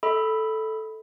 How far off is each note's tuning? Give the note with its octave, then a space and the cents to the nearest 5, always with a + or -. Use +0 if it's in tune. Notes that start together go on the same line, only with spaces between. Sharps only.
A4 +0 D#5 +40 B5 +0